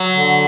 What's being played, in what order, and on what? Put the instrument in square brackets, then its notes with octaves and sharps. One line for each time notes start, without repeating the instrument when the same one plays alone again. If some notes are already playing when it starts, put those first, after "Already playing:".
Already playing: [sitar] F#3
[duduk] D3